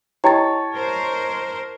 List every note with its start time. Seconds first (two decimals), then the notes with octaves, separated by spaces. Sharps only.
0.24 E4 G4 C#5 D#5 G5 A5 C#6 A6
0.75 A#4 C5